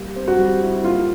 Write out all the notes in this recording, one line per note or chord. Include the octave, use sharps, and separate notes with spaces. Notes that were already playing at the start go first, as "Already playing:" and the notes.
Already playing: G3 A#3
C4
F#4
G3
E4
A#3 F4